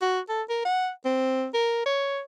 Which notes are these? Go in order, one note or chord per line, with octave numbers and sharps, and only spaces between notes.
F#4
A4
A#4
F#5
C4
A#4
C#5